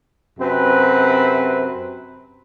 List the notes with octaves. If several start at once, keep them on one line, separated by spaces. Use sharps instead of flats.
F#2 C3 C4 B4